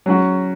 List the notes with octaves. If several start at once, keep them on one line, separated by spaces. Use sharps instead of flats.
F#3 C#4 F#4